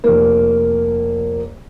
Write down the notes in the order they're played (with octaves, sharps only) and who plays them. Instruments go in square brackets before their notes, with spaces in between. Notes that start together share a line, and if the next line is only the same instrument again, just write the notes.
[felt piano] F1 A#3